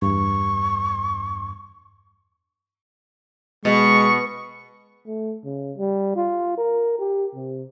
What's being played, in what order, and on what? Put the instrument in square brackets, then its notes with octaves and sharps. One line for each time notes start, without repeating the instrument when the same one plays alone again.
[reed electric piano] E2 G2 [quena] C#6
[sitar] B2 [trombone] G#3 [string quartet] C#6
[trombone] A3
C#3
G3
F4
A#4
G4
C3